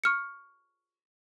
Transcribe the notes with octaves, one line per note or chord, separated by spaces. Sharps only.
C#6 F6 C#7